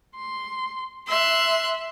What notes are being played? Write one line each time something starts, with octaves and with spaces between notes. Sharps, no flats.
C6
E5 C6 F#6